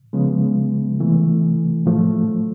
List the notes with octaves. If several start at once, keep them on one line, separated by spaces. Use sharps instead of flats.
C#3 F3 G#3 B3
C3 E3 A3
A2 F3 A3